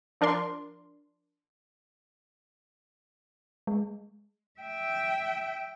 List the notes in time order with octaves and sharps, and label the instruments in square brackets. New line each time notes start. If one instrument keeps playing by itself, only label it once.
[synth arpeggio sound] F3 D4 A#4 D5 C6
[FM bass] G#3
[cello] E5 G5